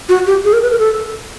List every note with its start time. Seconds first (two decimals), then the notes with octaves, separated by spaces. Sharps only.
0.09 F#4
0.27 G4
0.45 G#4
0.53 A#4
0.62 B4
0.71 A#4
0.79 A4